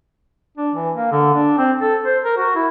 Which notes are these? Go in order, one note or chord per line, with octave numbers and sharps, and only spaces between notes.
D4
E3
A#3
D3
D4
C4
A4
C5
A#4
F#4
E4